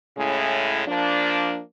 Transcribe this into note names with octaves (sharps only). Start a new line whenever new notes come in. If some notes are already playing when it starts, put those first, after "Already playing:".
A2 C#3 G#3 C#4 E4
F3 A#3 D4